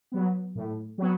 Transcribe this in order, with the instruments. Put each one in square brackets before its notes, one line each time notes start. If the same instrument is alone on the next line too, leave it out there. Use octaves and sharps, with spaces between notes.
[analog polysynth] F#3 B3
A2
F#3 B3